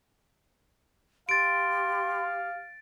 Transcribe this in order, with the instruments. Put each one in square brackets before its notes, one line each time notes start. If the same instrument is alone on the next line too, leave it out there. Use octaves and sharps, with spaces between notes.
[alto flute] G4 [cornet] F5 [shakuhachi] C6 [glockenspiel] A6 D7